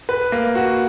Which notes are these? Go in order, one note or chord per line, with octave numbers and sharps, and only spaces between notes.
B4
A#3
F#4